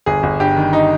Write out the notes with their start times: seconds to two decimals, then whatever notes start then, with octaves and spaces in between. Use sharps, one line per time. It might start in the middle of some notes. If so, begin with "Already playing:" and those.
0.06 G1 G#4
0.23 G1
0.40 G2 G4
0.57 D#3
0.73 D#4